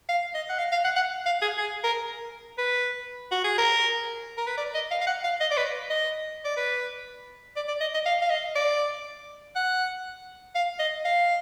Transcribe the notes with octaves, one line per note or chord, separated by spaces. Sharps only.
F5
D#5
F#5
F5
F5
F#5
F#5
F5
G#4
G#4
A#4
B4
F#4
G#4
A#4
A#4
B4
D5
D#5
F5
F5
F#5
F5
D#5
D5
B4
D#5
D5
B4
D5
D5
D#5
D#5
F5
F5
D#5
D5
F#5
F5
D#5
F5